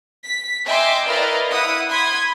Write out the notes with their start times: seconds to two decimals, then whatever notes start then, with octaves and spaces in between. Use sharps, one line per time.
0.25 B6
0.67 D#5 E5 G5 G#5 C6 D6
1.07 E4 A#4 B4 D5 D#5 F5
1.51 E4 E5 F#5 D#6
1.90 B5 C6 D#6 G#6